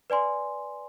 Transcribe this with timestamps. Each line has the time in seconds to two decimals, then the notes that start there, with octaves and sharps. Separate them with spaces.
0.10 B4 D5 G#5 C6